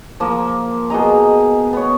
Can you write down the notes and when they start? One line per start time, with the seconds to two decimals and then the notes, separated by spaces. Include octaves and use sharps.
0.20 F3 A#3
0.90 B2 G#4 D#5 A#5
1.73 B3 C#5